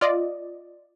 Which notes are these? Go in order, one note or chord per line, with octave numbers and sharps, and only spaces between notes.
F4 D5 D#5